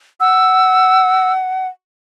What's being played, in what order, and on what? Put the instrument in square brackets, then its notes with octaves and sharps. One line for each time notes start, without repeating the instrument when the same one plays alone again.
[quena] F#5 [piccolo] E6